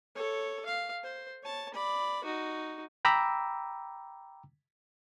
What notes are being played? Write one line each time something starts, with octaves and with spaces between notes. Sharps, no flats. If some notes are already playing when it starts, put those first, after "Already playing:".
A4 C#5
F5
C5
C#5 A5
D5 B5
D#4 F#4
G5 A#5 B5 D6 E6